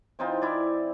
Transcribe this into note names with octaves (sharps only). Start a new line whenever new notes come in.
E3 C4 D#4 F4
E4 D5